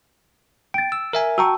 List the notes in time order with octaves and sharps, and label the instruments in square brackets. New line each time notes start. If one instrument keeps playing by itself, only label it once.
[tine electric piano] G5 [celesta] A6 D7
[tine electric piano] E6
A#4 E5 G#5
[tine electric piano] F#4 G5 C#6 [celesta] A5 A#5 E6